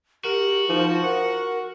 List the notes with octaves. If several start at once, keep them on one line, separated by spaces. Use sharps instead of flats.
F#4 G4 A#4
F3 D#4
A#4 F#5